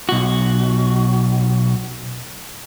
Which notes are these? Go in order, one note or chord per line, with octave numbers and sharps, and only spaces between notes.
B1 F#4